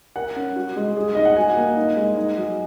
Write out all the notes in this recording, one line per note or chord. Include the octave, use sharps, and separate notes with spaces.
A#4 F#5
C#4
F#4
G#3
G#4
D#4 D#5
F#5
F#4 G#5
A#3
D#4
G#3
D#4
F#3